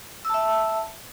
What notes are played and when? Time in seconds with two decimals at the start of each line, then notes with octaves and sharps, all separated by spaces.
0.25 E6
0.29 A5
0.34 E5